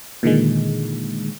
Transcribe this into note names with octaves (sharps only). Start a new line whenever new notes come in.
A#2 D3 D#3 G#3